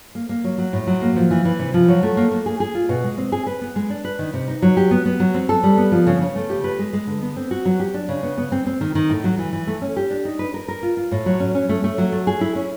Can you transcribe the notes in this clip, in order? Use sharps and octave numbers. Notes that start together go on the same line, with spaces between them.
A#3
A#3
F#3
F#3
A2
F#3
A#3
F3
E3
E3
C3
F3
F#3
A3
A#3
A#3
G#4
G#4
F4
B2
G#3
C4
G#4
B4
B3
G#3
D4
B4
D#3
C3
D#4
F#3
G4
B3
B3
F#3
C4
A4
G3
B3
F3
C#3
C#3
A3
G4
B4
G#3
G#3
D3
B3
C4
F#4
F#3
G4
D4
C#3
B3
B3
C4
C4
D#3
D#3
A2
F#3
E3
E3
A3
C#4
G4
D4
D#4
B4
A#4
A#4
F4
F4
A2
F#3
C#4
C#4
A3
A3
F#3
A3
G#4
E4
C#4